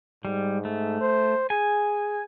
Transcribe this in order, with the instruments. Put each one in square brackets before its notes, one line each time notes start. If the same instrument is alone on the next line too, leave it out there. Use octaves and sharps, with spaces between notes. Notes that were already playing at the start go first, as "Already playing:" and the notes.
[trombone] G#2 [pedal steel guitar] G3
[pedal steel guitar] A3
[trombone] C5
[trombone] G#4 [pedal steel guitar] G#5